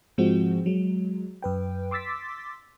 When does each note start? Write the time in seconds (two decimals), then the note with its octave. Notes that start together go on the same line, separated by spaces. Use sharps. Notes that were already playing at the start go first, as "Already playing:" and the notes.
0.18 G#2 F3 G#3 C4 F#4
0.66 F#3 G#3
1.42 F#2 B4 G5
1.91 C6 D6 E6 A6 B6